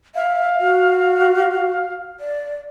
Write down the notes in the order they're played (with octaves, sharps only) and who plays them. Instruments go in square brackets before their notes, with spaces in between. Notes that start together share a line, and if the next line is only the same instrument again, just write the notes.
[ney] E5 [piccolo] F5
[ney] F#4
D5